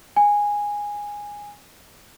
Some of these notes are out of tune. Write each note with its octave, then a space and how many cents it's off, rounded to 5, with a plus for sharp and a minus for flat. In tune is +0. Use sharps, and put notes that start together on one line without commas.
G#5 -10